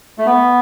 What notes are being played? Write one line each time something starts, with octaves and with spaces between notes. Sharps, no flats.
A3
B3